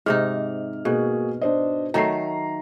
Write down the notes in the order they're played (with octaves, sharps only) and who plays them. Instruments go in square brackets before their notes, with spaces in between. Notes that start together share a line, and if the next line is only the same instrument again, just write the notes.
[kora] G#2 C3 D#4 [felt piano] F6
[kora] B2 [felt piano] A#3 F#4 G#4
[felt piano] D4 C5 D#5
[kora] D#3 F#3 A3 [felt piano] A#5 C7